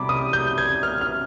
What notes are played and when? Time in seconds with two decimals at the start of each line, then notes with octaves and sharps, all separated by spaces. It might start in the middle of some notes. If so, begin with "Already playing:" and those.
Already playing: C3 G3 B5 D6
0.09 D#6
0.33 G6
0.58 G#6
0.83 F6
1.01 F6